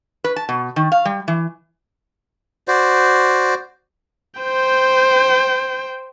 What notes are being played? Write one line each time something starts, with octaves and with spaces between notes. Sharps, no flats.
B4
A5
B2
D#3
F5
G3
E3
F#4 C5 D5
C5 G5